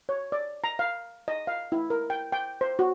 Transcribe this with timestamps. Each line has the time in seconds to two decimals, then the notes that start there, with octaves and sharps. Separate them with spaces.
0.09 C#5
0.32 D5
0.64 A#5
0.79 F5
1.28 D#5
1.47 F5
1.72 E4
1.90 A#4
2.10 G5
2.32 G5
2.61 C5
2.79 F#4